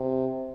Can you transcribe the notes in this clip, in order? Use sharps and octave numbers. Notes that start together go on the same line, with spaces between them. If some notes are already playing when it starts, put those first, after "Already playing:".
Already playing: C3